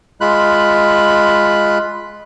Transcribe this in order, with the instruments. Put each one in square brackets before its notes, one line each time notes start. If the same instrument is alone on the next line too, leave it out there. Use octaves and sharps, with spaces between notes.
[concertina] G#3 F4 B5 F#6